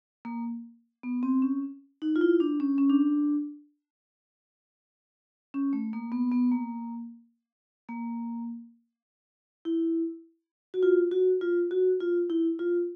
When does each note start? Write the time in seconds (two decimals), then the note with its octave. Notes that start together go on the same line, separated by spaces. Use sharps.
0.25 A#3
1.03 B3
1.23 C4
1.42 C#4
2.02 D#4
2.16 F4
2.21 E4
2.40 D4
2.60 C#4
2.78 C#4
2.90 D4
5.54 C#4
5.73 A3
5.93 A#3
6.12 B3
6.32 B3
6.51 A#3
7.89 A#3
9.65 E4
10.74 F#4
10.83 F4
11.11 F#4
11.41 F4
11.71 F#4
12.00 F4
12.30 E4
12.59 F4